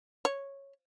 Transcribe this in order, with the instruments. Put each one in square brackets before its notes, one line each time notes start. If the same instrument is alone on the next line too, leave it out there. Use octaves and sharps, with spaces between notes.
[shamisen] C#5